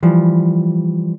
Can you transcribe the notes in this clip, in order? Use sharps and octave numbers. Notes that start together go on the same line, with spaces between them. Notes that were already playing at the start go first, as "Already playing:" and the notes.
E3 F3 G3